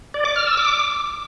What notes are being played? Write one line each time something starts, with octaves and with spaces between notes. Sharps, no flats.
D5
D6
F6
E6
D6